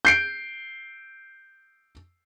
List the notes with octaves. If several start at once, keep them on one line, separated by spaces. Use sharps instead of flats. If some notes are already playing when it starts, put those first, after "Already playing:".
G6 C7 D7